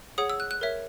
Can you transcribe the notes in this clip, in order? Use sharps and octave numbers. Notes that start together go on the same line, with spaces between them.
G#4 C#5 F#5 D#6
E6
F#6
F#6
A#4 C#5 E5